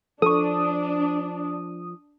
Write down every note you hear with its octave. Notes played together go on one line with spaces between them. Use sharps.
F3 D4 A4 C#6 D#6